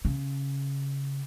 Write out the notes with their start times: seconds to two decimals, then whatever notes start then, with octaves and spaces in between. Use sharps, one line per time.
0.05 C#3